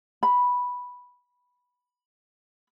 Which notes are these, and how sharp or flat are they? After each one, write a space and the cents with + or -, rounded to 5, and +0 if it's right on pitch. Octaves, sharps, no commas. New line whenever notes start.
B5 -5